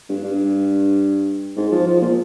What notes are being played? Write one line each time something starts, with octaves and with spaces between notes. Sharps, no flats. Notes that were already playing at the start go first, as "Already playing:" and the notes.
G2
G2
G#2
F3
F3
A#2